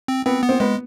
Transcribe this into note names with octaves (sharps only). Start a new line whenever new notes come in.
C4
B3 C4
B3
C4
G#3 B3